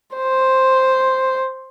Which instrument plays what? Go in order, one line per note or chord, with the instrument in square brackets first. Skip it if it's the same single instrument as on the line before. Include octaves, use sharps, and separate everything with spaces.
[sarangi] C5